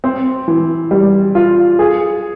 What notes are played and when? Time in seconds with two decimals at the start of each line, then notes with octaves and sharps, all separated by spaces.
0.04 C4
0.48 E3
0.91 G3
1.35 F4
1.79 G#4